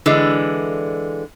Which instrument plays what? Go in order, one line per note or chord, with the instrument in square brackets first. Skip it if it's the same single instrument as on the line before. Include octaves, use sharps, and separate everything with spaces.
[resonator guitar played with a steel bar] D3 E3 G#3